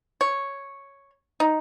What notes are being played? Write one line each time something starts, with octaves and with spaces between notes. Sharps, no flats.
C#5
D#4